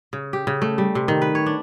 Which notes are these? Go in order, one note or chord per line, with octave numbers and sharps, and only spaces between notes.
C#3
G4
C#3
A3
G3
C3
D#3
B4
C#5
D4